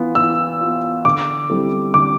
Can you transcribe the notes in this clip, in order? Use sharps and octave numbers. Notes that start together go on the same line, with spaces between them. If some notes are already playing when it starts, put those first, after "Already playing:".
Already playing: E3 B3 F4
E3 E6
B3 F4
D3 D6
G3 C4 E4 A4
D3 D6